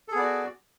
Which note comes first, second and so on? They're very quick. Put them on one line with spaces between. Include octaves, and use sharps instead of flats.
A4 G#4 B3 D5 F#4